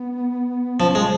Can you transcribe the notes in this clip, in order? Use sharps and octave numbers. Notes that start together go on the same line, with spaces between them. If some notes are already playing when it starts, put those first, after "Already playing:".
Already playing: B3
F3 C#4
G#3